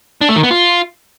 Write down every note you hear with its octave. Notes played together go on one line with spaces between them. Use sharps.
D4
A3
D#3
B3
F4